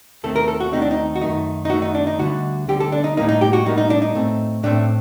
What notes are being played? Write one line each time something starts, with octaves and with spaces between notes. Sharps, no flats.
D#2 D#3 A3 C4 A4
A#4
A4
F#4
D#2 D#3 A3 C4 D#4
D4
D#4
F#4
F#2 D#3 A3 D#4
D#4
F#2 D#3 A3 F#4
D#4
D4
D#4
D2 D3 G3 F#4
D2 D3 G3 G4
A4
D4
D#4
A2 G3 A#3 D#4
D#4
G4
F#4
A2 G3 A#3 D#4
D#4
D4
D#4
A2 A3 C4
A2 A3 C4 D4